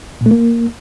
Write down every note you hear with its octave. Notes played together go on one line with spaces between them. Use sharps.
A#2
A3
A#3